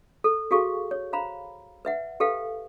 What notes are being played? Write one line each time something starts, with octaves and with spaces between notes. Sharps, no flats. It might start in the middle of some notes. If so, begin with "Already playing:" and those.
A4
F#4 G#4 A4 F5 C#6
C#5
C5 F5 A#5 B5
B4 E5 F#5
G4 A4 B4 F5 G5